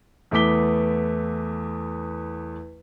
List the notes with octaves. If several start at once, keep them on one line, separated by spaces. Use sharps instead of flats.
E2 A3 B3 D6 B6 G7